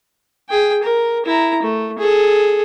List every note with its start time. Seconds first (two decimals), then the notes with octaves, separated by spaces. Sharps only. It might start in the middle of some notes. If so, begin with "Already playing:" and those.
0.49 G#4 G5
0.83 A#4
1.26 E4 A#5
1.62 A3
1.99 G#4 A4